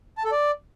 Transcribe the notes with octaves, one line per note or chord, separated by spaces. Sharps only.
A5
A4
D5